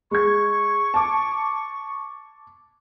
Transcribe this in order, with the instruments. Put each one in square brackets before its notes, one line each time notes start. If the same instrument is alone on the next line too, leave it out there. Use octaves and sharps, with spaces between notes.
[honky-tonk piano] G#3 G#6 [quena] C#6
[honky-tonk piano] A5 D6